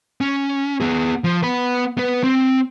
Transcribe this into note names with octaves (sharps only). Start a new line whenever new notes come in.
C#4
B3 G#4
F3
B3 B5
B3 B4
C4